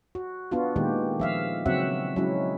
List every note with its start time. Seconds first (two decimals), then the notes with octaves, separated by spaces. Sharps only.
0.15 F#4
0.51 B3 D4 F4 F#4
0.76 A#2 D#3 G#3 G4
1.20 F3 E5 F5
1.66 C#3 F#3 C4 F#4 E5 F#5
2.16 F#3 G#3 C#4 E4